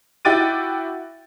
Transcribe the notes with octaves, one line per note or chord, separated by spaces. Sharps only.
E4 F#4 G5 D6 A6 D#7